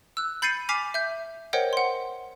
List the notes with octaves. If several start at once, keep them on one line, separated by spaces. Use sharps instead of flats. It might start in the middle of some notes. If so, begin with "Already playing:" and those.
E6 F#6
B5 G6 A6 C7 C#7 D#7
G#5 D6 F6 B6 C7 F7
E5 G6
A#4 C5 C#5 D#5 F#5 G5
F#5 C6